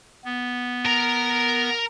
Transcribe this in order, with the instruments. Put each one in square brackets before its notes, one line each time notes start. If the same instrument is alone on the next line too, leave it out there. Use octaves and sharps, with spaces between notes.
[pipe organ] B3
[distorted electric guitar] A#4 A#5